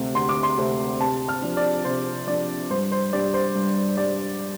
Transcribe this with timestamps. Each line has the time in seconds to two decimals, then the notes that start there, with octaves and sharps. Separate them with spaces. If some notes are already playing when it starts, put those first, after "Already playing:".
Already playing: D2 C3 A3 C4
0.15 D2 C6
0.29 D6
0.43 C6
0.57 C3 A3 C4
1.00 C3 A5
1.28 F6
1.42 F3 D4
1.57 D5
1.85 C3 C5
2.27 F3 D4 D5
2.70 G2 C5
2.92 C5
3.13 G3 D4 D5
3.34 C5
3.55 G2
3.97 G3 D4 D5